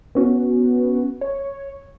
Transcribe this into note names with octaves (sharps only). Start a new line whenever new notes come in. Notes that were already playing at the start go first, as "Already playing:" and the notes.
B3 C#4 F#4
C#5